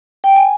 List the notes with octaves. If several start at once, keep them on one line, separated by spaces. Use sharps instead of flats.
G5
G#5